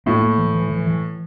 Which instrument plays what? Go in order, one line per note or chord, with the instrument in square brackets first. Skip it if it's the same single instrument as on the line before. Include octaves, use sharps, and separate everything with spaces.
[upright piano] A2 [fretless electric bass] A#3
[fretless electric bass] A#3
E3
E3
E3
E3